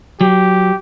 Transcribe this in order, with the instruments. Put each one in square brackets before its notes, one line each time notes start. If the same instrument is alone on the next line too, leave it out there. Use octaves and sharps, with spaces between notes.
[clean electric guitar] F#3 [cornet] G4